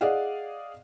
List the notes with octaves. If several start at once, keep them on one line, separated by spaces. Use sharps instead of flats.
G#4 D5 D#5 F5 F#5